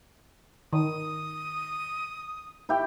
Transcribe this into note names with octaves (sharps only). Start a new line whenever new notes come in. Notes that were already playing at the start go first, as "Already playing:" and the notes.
D#3 D#6
E4 G4 G5